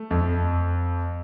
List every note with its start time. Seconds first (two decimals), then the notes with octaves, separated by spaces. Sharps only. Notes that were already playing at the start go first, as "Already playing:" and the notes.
Already playing: A3
0.11 F2